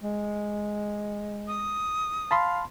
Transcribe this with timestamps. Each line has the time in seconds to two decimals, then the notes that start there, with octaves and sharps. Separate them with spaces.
0.04 G#3
1.48 D#6
2.31 F5 A5 B5 C6